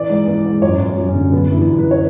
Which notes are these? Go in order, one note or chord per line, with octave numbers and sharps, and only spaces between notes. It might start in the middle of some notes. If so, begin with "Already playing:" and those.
Already playing: E3 D5
G#2
E3
G#2
F#2 C#5
F#2
F#2
C#4
D3
F#2 B3
E3 E4
D4
F#2
B4
C#5